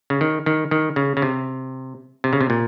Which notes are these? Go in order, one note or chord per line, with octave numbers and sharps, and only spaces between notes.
C#3
D#3
D#3
D#3
C#3
C#3
C3
C3
C#3
C3
A#2